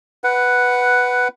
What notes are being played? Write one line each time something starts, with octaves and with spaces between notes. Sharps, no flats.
B4 F#5